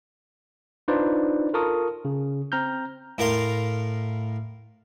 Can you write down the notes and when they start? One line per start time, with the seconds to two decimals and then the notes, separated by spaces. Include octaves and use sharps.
0.88 D4 D#4 F4 B4 C5 D5
1.54 F4 A4 A#4 A5 C#6 D#6
2.05 C#3
2.52 C4 A#5 F6 G6
3.18 A2 A#4 F5 C6